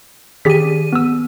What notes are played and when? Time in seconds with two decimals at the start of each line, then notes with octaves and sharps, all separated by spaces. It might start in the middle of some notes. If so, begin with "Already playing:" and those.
0.45 D#3 G4 G#4 B6 D#7
0.93 B3 E6